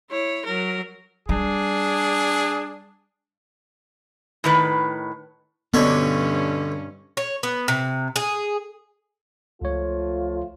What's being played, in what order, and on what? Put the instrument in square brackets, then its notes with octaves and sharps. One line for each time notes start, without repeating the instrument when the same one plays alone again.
[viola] E4 C#5
F#3 A#4
[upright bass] G3 [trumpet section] D4 G#4
[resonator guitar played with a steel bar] A2 D#3 B4
[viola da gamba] G2 C#4 [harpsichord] B2 D3 C#5 [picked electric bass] B3
[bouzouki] C#5
B3
C3
G#4
[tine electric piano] C#2 C#5 [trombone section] F3 A3 F4